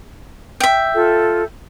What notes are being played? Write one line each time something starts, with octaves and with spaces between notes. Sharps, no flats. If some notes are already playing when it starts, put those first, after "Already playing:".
E5 G5
F4 A4